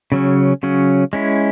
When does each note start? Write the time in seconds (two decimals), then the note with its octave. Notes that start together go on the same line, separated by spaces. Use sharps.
0.12 C#3 F#3 C#4
0.63 C#3 F#3 C#4
1.13 G#3 C#4 E4